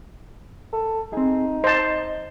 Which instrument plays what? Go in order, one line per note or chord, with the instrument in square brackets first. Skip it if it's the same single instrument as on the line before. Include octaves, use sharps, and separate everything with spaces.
[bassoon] A4
[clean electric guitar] C4 G#4 [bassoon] D#4
[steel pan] C5 A5 [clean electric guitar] D#5